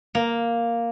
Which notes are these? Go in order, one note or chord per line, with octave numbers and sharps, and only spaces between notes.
A#3